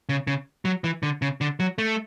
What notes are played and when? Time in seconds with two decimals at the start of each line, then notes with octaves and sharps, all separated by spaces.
0.09 C#3
0.27 C#3
0.65 F#3
0.84 E3
1.03 D3
1.22 C#3
1.41 D3
1.60 F#3
1.78 A3